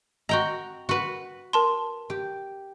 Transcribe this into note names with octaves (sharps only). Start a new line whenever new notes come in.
F#4 D#5 G5 A#5
F#4 B4
A#4 A5 C6
G4